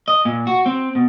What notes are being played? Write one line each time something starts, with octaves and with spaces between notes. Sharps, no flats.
D#5
A#2
F#4
C4
B2